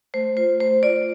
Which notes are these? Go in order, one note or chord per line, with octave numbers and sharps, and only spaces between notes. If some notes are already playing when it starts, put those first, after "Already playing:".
A3 C5
F4 C5
A3 C5
F4 D5